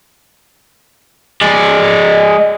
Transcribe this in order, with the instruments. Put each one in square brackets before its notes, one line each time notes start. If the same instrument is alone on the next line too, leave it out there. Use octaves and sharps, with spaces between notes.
[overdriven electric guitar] G#3 D5